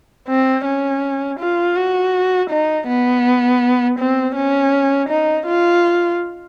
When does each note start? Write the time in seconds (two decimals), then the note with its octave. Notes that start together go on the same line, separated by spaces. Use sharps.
0.28 C4
0.65 C#4
1.39 F4
1.76 F#4
2.50 D#4
2.88 B3
3.98 C4
4.36 C#4
5.09 D#4
5.47 F4